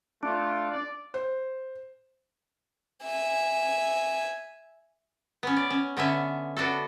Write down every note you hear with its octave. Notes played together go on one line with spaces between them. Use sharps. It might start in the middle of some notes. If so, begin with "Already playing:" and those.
A3 D4 F4
D5
C5
E5 G#5
B3 C#4
D5
C#4
D3 B3 C#4 E5
B3 D4 F#4 A4